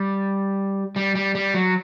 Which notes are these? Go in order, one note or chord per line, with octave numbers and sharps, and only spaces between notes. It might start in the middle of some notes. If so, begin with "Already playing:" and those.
Already playing: G3
G3
G3
G3
F#3